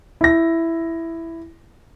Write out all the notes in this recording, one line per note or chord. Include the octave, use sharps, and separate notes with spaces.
E4 A#6